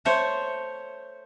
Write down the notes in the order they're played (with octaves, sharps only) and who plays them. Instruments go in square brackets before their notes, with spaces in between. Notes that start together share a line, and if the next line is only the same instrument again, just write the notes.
[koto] A3 C5 C#5